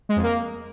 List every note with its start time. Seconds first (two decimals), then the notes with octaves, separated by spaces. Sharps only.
0.09 G#3
0.16 F2
0.23 A#3